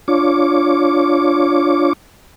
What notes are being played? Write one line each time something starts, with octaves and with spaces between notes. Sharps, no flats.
D4 F4 C#5 D6